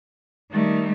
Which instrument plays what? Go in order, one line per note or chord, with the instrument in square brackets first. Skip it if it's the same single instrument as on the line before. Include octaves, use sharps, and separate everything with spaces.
[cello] D#3 G3 [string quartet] A3